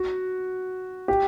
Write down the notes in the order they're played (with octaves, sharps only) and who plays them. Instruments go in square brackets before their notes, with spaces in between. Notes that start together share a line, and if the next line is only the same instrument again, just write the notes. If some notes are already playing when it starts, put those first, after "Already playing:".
Already playing: [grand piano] F#4
G4